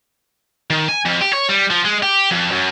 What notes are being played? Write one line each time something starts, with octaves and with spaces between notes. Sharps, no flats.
D#3
G#5
F2
G4
C#5
G3
F3
G#3
G4
F2
F#2